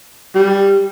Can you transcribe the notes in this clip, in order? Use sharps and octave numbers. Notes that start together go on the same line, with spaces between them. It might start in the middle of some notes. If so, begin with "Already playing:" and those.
G3